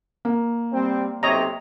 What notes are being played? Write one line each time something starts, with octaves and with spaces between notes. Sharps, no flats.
A#3
G3 C4
B1 C3 C4 C#5 D#5 A#5